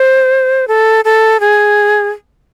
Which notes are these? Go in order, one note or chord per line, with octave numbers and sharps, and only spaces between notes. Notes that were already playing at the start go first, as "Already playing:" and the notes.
Already playing: C5
A4
A4
G#4